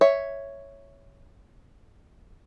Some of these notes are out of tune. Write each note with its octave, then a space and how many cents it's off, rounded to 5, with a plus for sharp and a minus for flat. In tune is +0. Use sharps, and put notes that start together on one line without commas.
C#5 +0 E5 +0